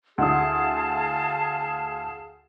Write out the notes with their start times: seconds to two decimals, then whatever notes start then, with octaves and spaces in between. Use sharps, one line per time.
0.18 D2 E4 G#4 F5 A5 D#6